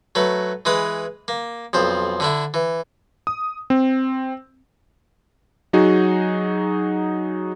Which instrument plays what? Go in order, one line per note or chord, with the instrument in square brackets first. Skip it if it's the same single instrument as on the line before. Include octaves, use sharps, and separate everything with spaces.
[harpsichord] F#3 A3 B4
E3 G#3 B4 D#6
A#3
B1 F2 C5
D3 D4 E4
E3
[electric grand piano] D#6
C4
F#3 D#4 F#4 G#4